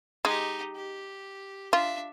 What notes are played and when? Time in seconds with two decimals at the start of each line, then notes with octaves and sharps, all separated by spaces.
0.25 G#3 D#4 G4
0.76 G4
1.73 D4 F4 E5